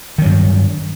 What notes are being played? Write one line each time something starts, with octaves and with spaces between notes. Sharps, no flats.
G2 D#3 F#3